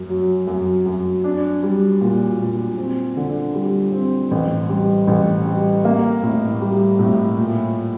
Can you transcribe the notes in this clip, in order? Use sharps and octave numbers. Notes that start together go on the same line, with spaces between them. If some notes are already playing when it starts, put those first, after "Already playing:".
Already playing: F#2
F#3
F#2
F#2
D4
G3
A#2
A#2
C4
D3
G3
C4
A1
G3
A1
G3
A#3
A2
G3
A2
A#2